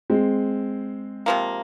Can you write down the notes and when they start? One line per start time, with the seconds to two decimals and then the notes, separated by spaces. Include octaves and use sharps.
0.10 G#3 C4
1.26 C3 F3 A#3